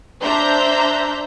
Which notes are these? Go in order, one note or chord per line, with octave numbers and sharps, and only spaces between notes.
D4 C5 E5 A#5 G6